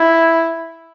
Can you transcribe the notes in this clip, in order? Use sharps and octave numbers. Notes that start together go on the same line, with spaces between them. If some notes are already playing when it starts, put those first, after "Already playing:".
Already playing: E4